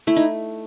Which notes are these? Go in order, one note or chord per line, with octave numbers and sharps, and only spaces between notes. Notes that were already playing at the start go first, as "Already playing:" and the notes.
A3 E4
D#4